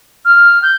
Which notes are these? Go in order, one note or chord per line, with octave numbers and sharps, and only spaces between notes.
F6
G6